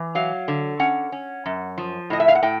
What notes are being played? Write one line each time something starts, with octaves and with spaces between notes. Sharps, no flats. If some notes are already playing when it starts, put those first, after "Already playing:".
Already playing: E3
F#3 F5
D3
C#4 F#5
C#4
F#2
F3
A2 D#5
E5
F5
F#5
A2 G5